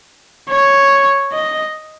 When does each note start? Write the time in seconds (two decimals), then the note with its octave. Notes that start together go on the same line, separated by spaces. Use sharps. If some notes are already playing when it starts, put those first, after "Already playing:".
0.49 C#5
1.32 D#5